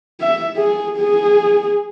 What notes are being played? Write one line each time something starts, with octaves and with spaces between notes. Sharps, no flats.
E5
G#4
G#4